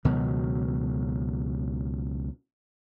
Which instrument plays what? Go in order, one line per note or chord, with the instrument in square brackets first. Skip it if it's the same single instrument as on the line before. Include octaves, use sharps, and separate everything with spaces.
[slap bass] C#2 B2 D#3 F#3